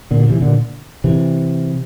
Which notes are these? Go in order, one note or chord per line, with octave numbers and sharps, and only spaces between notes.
A#2 D3
C3 E3
A#2 D3
C3 E3